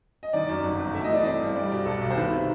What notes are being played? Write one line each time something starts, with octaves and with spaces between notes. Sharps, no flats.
D#5
D#3 D5
F#2
G1
G1
A3 E5
D#5
E3 D5
C4 D#5
G2
G3 D5
B2
B1 A4
B1
C5
D#3 B4
C3